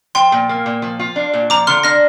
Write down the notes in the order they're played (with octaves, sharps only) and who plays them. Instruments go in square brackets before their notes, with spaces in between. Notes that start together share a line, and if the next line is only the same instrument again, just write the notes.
[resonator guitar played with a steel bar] F3 [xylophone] G5 C6
[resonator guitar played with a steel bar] A#2
A#3
A#2
F3
F4
D4
A#2
[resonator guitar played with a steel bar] F3 [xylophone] A#5 D6
[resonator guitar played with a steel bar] D3 [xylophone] C6 F6
[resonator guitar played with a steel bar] D4 [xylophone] F6 A#6